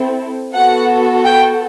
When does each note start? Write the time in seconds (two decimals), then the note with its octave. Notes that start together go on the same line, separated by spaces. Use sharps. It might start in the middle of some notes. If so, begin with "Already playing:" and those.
Already playing: C4 E4 A4
0.53 B3 F#4 A4 F#5
1.24 G5